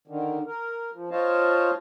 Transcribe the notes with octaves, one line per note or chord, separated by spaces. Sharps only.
D3 D#3
A#4
F3
F4 C5 C#5 D#5 F5 A5